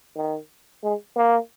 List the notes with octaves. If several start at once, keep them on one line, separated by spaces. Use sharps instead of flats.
D#3
G#3
A#3